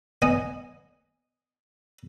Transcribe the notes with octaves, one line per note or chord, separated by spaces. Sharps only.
B3 D#5 G#5